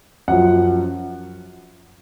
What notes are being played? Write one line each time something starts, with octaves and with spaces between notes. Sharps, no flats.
F#2 F3 F#5